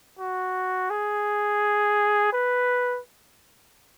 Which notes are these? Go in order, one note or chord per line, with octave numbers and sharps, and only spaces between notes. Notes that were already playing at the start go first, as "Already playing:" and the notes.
F#4
G#4
B4